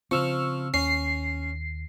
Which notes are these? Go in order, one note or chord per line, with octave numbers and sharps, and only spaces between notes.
C#3 F3 C4 C#6 E6 F6
D#2 C#4 C7